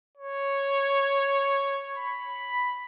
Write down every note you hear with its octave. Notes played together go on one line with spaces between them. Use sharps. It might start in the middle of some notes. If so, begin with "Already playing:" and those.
C#5
B5